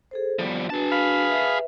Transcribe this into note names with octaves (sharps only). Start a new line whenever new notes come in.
G#4 A4 C5
F3 G3 B3
D4 F#4 G#4 B4 A5
F5 B5
B4 E5